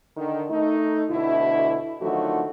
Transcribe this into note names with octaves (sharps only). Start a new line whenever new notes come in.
D3 D#3
A3 D#4
D2 B2 D3 E4
D3 D#3 F3 F#3 A3 F#4